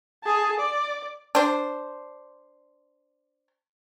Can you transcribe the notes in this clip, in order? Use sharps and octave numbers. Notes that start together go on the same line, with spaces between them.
G#4 A5
D5
D4 C5